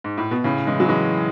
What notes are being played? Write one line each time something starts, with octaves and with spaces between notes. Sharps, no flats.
G#2
A2
B2
A2 C#3
E3 G#3
F#3
E3 G#3